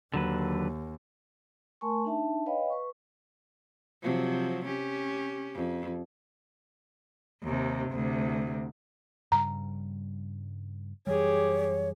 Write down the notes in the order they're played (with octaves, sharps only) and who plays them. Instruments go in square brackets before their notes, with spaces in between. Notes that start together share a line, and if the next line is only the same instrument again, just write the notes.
[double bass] D#2 [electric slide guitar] D3 F#3 B4
[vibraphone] A3 A#4 G#5 A5 C6 C#6
D4 D#4 E5 A5
B4 C#5 D#5 F5 G5 B5
B4 C#6
[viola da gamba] C3 F3 F#3
C#4 G4
F2
[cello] D#2 C3
D2 C3
[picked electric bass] G2 C#3 G3 [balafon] A#5
[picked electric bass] F#2 E3 G3 [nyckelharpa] G4 G#4 [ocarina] C#5